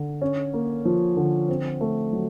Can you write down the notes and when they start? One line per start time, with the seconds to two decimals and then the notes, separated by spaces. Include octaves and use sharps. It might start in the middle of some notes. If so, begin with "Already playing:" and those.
Already playing: D3
0.21 C#4
0.53 A#3
0.85 F3
1.17 D3
1.48 C4
1.81 A3
2.13 F#3